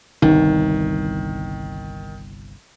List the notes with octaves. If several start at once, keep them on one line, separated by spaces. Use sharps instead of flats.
G1 C2 D#3